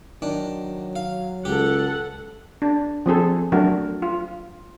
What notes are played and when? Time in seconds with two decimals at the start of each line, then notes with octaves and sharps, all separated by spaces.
0.22 D#3 F#3 D4
0.96 F5
1.45 C#2 G4 A4 F#5
2.62 D4
3.06 F3 C4 G#4 A4
3.52 F#3 A3 D4 F#4 A#4
4.02 F4